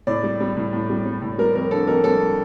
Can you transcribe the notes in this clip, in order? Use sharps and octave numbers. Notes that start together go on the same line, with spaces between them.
A2 D5
G3
G3
A2
A2
G3
G3
A2
G3 A#4
F2 A#4
D3 A4
F2 A#4
G3 A4